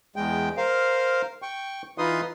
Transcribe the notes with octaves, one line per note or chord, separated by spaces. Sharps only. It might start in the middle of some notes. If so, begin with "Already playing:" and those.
E2 G#3 G5
A#4 C5 F5
G5 C#6
E3 D#4 F4 B4 C6 D#6